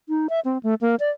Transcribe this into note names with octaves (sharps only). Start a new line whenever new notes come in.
D#4
E5
C4
A3
A#3
D5